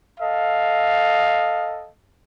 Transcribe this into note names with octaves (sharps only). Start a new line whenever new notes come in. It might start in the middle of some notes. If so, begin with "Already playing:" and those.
A4 D#5 F5